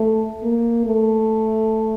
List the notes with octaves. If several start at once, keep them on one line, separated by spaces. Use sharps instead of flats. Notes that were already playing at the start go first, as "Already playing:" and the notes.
Already playing: A3
A#3
A3